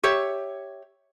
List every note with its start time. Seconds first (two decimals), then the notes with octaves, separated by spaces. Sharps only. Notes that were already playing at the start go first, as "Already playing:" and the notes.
0.03 G4 C#5 E5